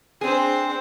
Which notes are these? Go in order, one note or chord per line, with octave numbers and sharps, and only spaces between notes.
C4 D4 G#4 C5